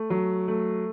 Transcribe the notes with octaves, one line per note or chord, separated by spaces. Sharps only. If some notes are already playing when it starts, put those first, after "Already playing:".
Already playing: A3
F#3
A3